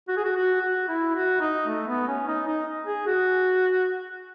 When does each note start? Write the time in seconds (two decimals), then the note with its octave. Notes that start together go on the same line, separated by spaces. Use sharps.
0.08 F#4
0.17 G#4
0.24 F#4
0.36 F#4
0.61 F#4
0.88 E4
1.15 F#4
1.40 D#4
1.67 A3
1.88 B3
2.08 C#4
2.27 D#4
2.47 D#4
2.86 G#4
3.06 F#4